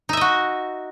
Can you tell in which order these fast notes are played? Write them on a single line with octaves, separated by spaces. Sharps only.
D#4 E5 D#5 F#4